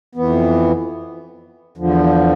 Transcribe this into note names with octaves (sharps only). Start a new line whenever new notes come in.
F2 E3 B3
E2 D3 F3